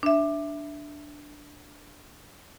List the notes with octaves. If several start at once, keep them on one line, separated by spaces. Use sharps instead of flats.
D4 E5